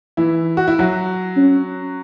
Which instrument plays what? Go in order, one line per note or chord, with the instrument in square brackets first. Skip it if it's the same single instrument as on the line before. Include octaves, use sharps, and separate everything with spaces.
[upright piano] E3 E4
F#4
E4
F#3 F#4
[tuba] C#4